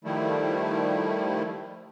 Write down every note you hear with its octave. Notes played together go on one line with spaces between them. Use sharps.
D#3 F3 G3 A3 E4